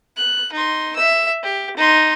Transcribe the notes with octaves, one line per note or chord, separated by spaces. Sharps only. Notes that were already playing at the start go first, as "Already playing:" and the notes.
F#6
D#4 C6
E5 E6
G4
D#4 C6